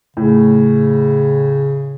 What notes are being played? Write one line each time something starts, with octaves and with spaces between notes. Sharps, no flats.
A2 C#3